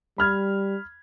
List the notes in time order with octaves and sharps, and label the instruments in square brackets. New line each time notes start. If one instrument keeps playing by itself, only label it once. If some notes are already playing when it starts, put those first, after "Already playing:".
[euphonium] G3 [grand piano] B5 F6 G#6